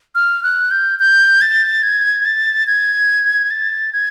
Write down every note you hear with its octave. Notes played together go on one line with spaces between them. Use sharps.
F6
F#6
G6
G6
A6
G#6
A6
G#6
A6
G#6